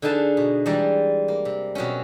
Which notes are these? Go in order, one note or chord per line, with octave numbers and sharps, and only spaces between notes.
D3 D#4 G#4 B4 A5
B2
E3 G3 G#3 D5 A#5
A#3
C3
B2 F#3 C4 C#4